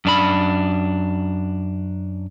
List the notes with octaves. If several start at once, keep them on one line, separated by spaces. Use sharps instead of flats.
F#2 D4 B5